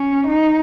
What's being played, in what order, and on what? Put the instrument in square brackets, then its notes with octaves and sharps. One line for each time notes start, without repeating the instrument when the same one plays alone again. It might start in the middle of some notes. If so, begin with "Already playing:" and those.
Already playing: [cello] C#4
D#4